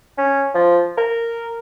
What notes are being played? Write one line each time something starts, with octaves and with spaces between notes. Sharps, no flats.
C#4
F3
A#4